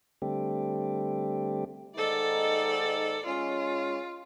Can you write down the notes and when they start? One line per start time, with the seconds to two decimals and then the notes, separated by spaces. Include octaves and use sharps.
0.22 D3 G3 A3 C4 G4
1.96 G#2 D#3 D#4 A4 D5
3.26 G#3 C#4 F4